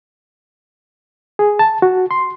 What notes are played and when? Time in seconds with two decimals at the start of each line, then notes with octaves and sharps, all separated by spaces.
1.39 G#4
1.59 A5
1.82 F#4
2.11 C6